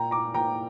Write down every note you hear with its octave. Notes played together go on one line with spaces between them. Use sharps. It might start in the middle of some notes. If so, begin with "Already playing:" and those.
Already playing: A#2 G5 A#5
A#5 D6
A#2 G5 A#5